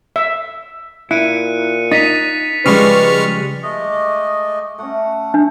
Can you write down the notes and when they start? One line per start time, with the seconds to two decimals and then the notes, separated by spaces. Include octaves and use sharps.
0.16 E5
1.11 A#2 E4 F#6 C#7 D#7
1.91 D#4 A6 B6 F7
2.66 C#3 F3 G3 G#3 B4 C#6 F6
3.62 G#3 A3 D#5
3.81 D6
4.79 A3 C#4 F#5
5.34 D4